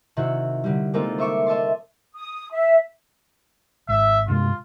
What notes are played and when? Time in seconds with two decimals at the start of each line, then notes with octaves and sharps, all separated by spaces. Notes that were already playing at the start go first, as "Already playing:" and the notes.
0.17 C3 D#3 E4 F#4
0.64 D3 G3
0.93 G#3 A#3 C4 D#4 F4 A4
1.18 C5 E5 C#6 D6
1.46 D#5 E5 A5 C6
2.15 D#6
2.52 E5
3.88 G#1 E5
4.28 G2 C3 G#3 F4